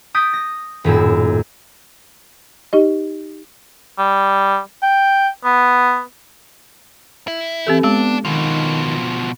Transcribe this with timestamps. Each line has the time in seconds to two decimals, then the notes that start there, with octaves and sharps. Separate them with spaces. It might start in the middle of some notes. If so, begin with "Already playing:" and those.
0.14 D#6 G6 A6 B6 D7
0.33 A#6
0.84 D#1 F#2 A2 E6
2.73 D#4 G4 D#5
3.99 G3
4.83 G5
5.45 B3
7.28 E4
7.67 E3 C4 G4 A4
7.84 G#3 B3 D4
8.25 B2 D#3 F3